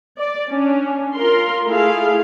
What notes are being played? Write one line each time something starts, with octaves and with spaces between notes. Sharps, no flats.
D5
C#4 D4
F4 A#4 C6
A3 E4 F4 G#4 F5